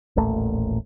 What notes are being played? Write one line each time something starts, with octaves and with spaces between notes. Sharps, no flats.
D#1 A1 A#2 A3